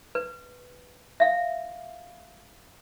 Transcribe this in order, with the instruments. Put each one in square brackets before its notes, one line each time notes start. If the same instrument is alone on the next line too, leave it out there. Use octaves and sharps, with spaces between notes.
[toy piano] B4
E5 F5